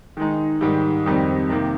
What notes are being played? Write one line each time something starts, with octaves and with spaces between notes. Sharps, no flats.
D#3 G#3 D#4
G#2 D#3 G3
F2 D#3 G3 C4 D#4
C3 D#3 A#3